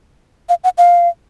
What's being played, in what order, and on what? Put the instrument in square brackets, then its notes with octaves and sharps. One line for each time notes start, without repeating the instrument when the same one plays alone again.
[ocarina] F5
F#5
F5